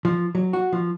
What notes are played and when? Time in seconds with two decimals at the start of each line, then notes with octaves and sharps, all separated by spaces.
0.05 F3
0.35 F#3
0.53 F#4
0.72 F3